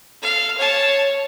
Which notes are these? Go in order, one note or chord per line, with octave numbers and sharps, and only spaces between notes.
A4 F5
C#5 A5